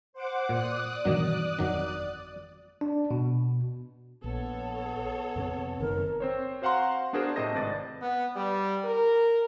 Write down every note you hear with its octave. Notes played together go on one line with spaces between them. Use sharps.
C5 F#5 D6
A#2 D5 D#6 F#6
G2 B2 D#3 E3 F#3
G1 F2 D#3 F#3
D4
B2
A#1 B3 A4 C#5
F2 C3 C4
F#1 D#3 A#4
C4 C5 C#5
F#4 C5 F5 F#5 A#5 C6
B3 D4 F#4 G#4 A#4 C5
A2 C3 C5 D#5 A5 A#6
G#1 B4 D5 D#5 A6
B3
G3
A#4